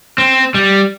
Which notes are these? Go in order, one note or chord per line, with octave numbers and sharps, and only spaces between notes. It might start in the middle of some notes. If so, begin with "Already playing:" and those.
C4
G3